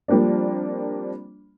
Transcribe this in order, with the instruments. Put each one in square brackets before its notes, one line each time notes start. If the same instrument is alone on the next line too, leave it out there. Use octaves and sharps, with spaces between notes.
[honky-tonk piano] F3 G3 A#3 C4 D4